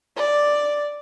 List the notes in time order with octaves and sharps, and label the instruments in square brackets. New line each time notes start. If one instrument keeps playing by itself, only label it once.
[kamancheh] D5